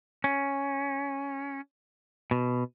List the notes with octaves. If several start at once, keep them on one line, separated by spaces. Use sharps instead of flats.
C#4
B2